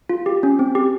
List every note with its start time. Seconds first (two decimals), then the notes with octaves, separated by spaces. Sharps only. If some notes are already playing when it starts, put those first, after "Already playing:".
0.09 F4
0.26 G4
0.43 C#4
0.59 C4
0.75 G4